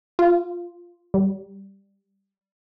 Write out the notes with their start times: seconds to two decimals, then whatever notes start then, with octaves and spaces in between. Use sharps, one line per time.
0.19 F4
1.14 G3